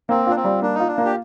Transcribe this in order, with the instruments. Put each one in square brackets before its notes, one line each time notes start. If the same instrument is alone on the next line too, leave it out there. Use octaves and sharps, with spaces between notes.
[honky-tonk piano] A#3 [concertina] C4
[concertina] D4 [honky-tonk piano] F4
[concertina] C4
[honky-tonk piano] G3
[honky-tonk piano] A#3 [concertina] D4
[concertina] D#4 [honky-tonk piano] F4
[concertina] D4
[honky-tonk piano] A#3
[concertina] G4